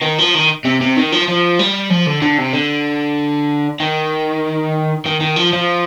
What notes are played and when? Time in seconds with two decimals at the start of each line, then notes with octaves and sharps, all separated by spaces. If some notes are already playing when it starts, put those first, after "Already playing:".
0.01 D#3
0.18 F3
0.34 D#3
0.65 C3
0.81 C3
0.96 D#3
1.12 F3
1.28 F3
1.59 G3
1.90 F3
2.06 D3
2.22 D3
2.38 C3
2.53 D3
3.80 D#3
5.06 D#3
5.21 D#3
5.36 F3
5.53 F3